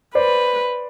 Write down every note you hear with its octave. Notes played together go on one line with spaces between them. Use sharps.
B4 C5 D5